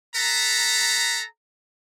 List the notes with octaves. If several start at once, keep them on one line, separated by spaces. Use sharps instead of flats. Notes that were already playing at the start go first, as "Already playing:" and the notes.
A4 B4 A#5